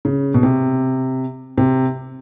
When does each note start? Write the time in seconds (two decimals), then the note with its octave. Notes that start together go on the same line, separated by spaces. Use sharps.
0.05 C#3
0.34 B2
0.43 C3
1.58 C3